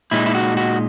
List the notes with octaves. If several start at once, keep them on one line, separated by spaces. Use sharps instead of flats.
A#2 G#3 D#4 E4
E4
F#4
F#4